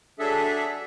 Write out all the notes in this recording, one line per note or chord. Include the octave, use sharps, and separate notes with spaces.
F#3 D4 G#4 A4 E5